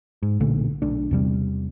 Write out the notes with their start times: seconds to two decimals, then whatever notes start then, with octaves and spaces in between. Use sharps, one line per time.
0.23 G#2
0.40 B1 A#2 D3 A3
0.82 B1 A3 D4
1.11 E2 C3 G3